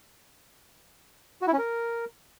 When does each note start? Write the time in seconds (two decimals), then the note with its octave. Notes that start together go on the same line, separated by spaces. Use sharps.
1.42 F#4
1.47 E4
1.53 C#4
1.58 A#4